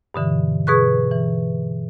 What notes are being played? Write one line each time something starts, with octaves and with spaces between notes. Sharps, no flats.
G2 B2 D3 E3
B2 G#4 B4 C#6 F#6
E3